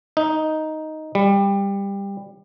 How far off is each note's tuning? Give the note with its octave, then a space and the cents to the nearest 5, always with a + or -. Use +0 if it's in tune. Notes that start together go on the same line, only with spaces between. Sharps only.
D#4 +5
G3 +20